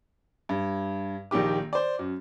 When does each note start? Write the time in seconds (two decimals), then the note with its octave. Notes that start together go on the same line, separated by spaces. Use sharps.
0.49 G2
1.31 A#1 D#3 G4 D6
1.73 C5 D5
1.99 F#2